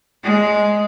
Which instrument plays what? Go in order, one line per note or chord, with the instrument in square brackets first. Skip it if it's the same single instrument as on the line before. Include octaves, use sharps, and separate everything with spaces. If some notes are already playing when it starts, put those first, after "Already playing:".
[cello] G#3